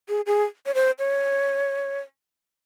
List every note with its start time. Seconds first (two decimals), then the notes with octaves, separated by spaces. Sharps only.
0.09 G#4
0.26 G#4
0.66 C#5
0.75 C5
0.99 C#5